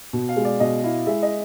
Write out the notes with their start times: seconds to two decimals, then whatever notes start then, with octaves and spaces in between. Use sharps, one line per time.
0.13 B2
0.29 F5
0.37 G#3
0.45 D5
0.60 B2 D#5
0.84 E4 F5
1.07 G#3 E5
1.23 D#5